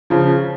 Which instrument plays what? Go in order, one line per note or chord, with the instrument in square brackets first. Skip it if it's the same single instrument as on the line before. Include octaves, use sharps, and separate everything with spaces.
[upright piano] C#3 F3